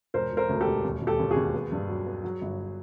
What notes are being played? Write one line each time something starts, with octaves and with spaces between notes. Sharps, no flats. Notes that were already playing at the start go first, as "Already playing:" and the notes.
E1 A#4 C5
E1
A#4 C5
D2
G4 A4
E1
D#2
E1
G4 A4
D#2
F#4 G#4
D#2
B3
G2
F#3
B3
F#3
G1